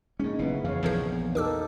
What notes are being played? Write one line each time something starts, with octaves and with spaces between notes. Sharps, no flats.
A2 G#3 A#3 C#4 D#4
F#1 B2 B3 E4
F2 C#3 E3 C#5 F5
A#1 E2 E3 F3 G#4
D#4 G4 A4 A#4 D6 E6